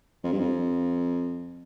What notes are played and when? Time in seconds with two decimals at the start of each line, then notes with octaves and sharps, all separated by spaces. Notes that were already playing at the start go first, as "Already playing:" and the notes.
0.24 F2
0.32 G2
0.39 F2